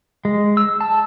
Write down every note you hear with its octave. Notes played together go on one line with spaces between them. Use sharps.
G#3
E6
A5